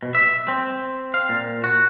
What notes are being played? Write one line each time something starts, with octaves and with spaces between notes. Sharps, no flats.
B2
E5
C4
F5
A#2
F#4